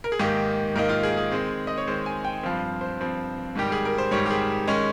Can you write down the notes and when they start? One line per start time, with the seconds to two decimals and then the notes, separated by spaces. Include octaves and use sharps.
0.04 A#4
0.12 G#4
0.19 G#2 D#3 A#3 D#4 G4
0.75 G#2 D#3 A#3 D#4 A#4
0.89 F4
1.03 G#4
1.17 G#4
1.31 D#3 G#3 C4
1.67 D#5
1.77 C#5
1.87 D#3 G#3 C4 C5
2.06 G#5
2.25 G5
2.43 G2 F3 C4 F5
2.81 C5
3.00 G2 F3 C4
3.55 G#2 D#3 G3 G4
3.72 G#4
3.85 A#4
3.98 C5
4.11 G#2 D#3 G3 C#5
4.26 G4
4.30 G#4
4.68 D#3 G#3 C#4